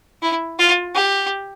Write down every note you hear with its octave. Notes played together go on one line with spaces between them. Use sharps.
E4
F4
G4